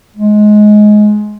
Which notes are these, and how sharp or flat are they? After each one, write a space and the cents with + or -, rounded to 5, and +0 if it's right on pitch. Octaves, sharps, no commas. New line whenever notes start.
G#3 +15